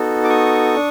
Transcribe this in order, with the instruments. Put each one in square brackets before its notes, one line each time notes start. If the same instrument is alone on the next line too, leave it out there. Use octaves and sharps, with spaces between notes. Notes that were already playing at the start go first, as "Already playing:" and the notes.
Already playing: [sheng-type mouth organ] B3 D#4 F#4 A4
D6
C#6 D#6
D4